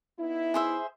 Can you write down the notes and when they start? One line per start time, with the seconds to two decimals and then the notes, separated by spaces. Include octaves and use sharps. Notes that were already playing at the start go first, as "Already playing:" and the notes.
0.18 B3 D#4 E4
0.54 G#4 C5 E5